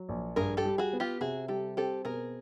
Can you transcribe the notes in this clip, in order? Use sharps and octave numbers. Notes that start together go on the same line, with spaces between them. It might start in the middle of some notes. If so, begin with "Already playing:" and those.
Already playing: F#3
A#1
G2 G#4 A#4
G4 A4
G3
F#4 G#4
B3
F4 G4
C3 F#4 G#4
G3 G4 A4
C4 G4 A4
B2 G#4 A#4